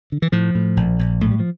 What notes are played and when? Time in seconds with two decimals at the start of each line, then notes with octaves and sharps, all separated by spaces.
0.12 D3
0.22 E3
0.32 A2 F3
0.55 A2
0.77 A#1
0.99 A#1
1.21 A2 A3
1.31 G3
1.40 F3